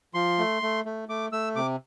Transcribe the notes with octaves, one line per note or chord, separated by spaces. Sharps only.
F3 C6
A3
A3
A3
A3 D6
A3 E6
C3 D6